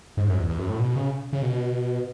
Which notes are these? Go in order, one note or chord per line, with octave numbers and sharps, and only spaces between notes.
G#2
F#2
E2
E2
F#2
A2
B2
C#3
C#3
B2